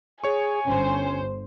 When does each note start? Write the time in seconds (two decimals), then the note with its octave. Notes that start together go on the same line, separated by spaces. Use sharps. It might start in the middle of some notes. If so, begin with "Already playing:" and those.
0.24 G#4 C#5 G#5 C#6
0.65 G1 C#4 C5